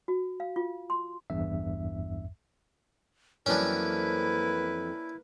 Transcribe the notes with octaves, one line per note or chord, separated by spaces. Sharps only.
F#4
F5
F4
C6
A1 E2 G2 E5
F2 E3 F#3 A#3 C#4 D4 E4 B4